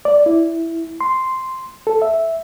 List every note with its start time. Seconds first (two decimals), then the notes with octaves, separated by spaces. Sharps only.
0.05 D5
0.26 E4
1.01 C6
1.87 A4
2.02 E5